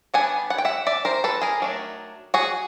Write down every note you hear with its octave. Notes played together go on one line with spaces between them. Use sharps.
G3 B3 D4 F#5 G#5
F#5
G5
E5 F#5
D5 E5
A#4 C5
A4 B4
G#4 A#4
D#3 F#3 A3 D4
F#4 G#4